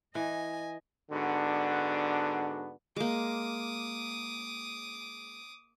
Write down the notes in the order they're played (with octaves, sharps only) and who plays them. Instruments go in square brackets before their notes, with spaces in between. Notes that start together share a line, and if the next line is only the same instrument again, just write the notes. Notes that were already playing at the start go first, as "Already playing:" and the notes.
[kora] E3 [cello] D#5 [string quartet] G#5
[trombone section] G#2 D3 B3 D4 F#4
[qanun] G#3 A#3 [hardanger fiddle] D6 D#6